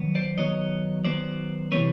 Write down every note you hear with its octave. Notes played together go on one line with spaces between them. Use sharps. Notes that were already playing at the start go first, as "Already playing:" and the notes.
Already playing: D#3 F#3 B3
C5 D5
D#3 F#3 B3 C#5 D#5
D#3 F#3 B3 C5 D5
C3 E3 G3 C4 B4 C#5